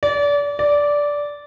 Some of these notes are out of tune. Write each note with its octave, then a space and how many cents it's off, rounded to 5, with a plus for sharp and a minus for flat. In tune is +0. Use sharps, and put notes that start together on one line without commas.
D5 -30
D5 -10